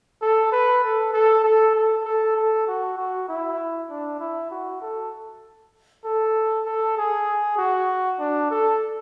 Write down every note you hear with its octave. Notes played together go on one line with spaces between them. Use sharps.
A4
B4
A4
A4
A4
A4
A4
A4
F#4
F#4
E4
D4
E4
F#4
A4
A4
A4
G#4
F#4
D4
A4